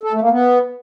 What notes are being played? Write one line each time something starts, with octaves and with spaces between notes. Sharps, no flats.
A4
A3
A#3
B3